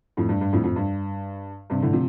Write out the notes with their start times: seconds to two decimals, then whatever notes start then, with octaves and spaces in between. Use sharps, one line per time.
0.17 F2 A2
0.29 G2
0.41 G2
0.53 F2 A2
0.64 F2
0.76 G2
1.70 G2 C3
1.83 A2 D3
1.93 C3 F3